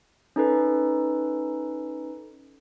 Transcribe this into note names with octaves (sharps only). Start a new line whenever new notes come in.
C#4 D#4 A4 B4